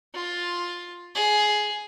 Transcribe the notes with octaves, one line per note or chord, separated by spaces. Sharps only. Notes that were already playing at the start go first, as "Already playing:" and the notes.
F4
G#4